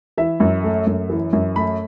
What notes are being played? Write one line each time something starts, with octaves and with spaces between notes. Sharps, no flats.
E3 E5
F#2
A3
F#2
E3
F#2
A3 B5